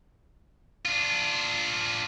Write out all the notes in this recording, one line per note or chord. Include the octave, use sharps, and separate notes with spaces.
D4 F4